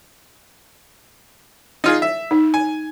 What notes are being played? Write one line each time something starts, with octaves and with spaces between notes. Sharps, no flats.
D#4 F4 G#4
E5
D#4
G#5